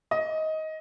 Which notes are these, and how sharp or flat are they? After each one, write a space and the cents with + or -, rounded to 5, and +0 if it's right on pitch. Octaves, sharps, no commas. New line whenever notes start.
D#5 +15